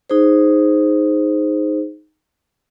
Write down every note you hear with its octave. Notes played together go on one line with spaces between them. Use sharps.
D#4 G#4 C5